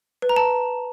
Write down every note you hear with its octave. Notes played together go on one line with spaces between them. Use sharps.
B4
A#5
A5